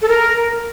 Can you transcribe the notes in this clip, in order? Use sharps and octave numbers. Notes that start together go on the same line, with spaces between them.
A4
A#4